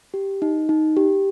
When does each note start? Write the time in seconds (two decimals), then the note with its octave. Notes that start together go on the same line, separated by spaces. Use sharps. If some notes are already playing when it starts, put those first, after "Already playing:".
0.14 G4
0.42 D#4
0.69 D#4
0.97 G4